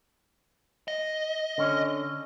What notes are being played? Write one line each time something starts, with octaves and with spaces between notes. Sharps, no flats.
D#5
D3 C#4